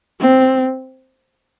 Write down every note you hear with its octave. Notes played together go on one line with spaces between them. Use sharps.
C4